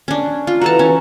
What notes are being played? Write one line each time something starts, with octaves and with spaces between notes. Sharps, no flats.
C#4 D4
F4
E3 F#4 A4 A5 A#5
C#4